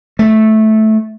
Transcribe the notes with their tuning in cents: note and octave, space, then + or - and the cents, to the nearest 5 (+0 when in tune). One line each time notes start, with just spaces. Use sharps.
A3 -10